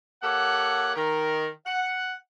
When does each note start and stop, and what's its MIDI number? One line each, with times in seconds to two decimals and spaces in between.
0.23 0.92 58
0.23 0.92 67
0.23 0.92 69
0.23 0.92 73
0.23 0.92 78
0.96 1.48 51
0.96 1.48 70
1.66 2.13 78